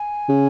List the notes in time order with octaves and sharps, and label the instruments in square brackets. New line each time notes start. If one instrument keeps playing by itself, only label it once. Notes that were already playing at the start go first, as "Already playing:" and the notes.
Already playing: [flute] G#5
[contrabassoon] C#3